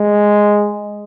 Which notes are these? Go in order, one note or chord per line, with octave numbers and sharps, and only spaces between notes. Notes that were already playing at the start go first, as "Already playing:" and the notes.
Already playing: G#3